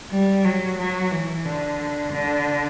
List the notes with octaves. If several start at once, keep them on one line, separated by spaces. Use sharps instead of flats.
G3
F#3
F#3
E3
D3
D3